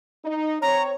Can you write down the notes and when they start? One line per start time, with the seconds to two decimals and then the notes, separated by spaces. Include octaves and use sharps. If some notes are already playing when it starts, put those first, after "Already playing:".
0.25 D#4
0.62 C4 C#5 A#5